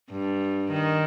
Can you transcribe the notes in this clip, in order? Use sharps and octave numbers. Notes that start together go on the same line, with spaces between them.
G2
D#3